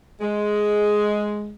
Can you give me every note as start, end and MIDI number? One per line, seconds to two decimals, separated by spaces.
0.21 1.55 56